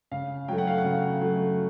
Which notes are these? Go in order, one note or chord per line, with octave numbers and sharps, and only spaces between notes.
C#3 F5
F#3 A3 G5
F#5
F5
F#5
C#3
F#3 A3